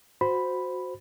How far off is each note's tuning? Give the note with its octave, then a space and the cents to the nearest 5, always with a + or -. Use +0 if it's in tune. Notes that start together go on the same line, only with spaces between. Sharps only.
F#4 -15 C5 -10 B5 +0